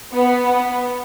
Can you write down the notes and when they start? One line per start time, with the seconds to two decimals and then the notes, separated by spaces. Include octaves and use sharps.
0.13 B3
0.45 B3